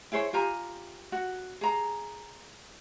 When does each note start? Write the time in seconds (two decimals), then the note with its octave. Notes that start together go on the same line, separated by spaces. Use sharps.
0.12 E4 G#4 C5 C#5
0.33 F4 G4 G#5 A#5
1.12 F#4
1.61 G#4 A#5